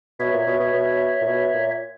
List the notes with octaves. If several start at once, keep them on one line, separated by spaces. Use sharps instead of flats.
B2 C#5 E5
A#2
B2
B2
B2
A#2
B2
A#2